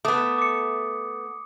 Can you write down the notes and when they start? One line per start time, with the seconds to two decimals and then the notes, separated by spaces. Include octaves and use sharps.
0.05 A3 B3 D6 D#6
0.38 D6 C#7